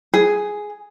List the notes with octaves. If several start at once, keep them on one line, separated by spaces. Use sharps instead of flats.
G#4